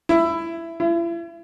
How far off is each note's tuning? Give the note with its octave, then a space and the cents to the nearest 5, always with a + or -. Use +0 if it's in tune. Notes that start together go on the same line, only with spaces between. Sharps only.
E4 +15
E4 +40